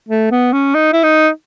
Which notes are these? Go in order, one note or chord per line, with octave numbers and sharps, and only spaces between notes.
A3
B3
C#4
D#4
E4
D#4